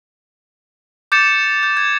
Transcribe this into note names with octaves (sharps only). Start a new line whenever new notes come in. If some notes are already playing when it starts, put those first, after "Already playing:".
D6 G6 A6 C#7 E7
G6
G#6